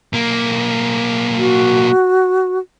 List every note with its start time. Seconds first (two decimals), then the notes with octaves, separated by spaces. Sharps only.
0.13 B1 A#3
1.37 F#4